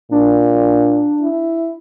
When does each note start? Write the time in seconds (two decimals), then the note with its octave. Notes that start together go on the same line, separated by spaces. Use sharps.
0.11 A#2 D4
1.22 E4